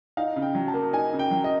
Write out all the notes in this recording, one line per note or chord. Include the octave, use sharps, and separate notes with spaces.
D#4 F5
C#3
G5
F#3
A5
A#3
D#4 G#5
C#3
G5
F#3
D#5